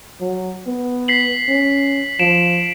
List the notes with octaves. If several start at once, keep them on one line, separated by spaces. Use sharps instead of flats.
F#3
B3
B6 C7 F#7
C#4
F3 D7 E7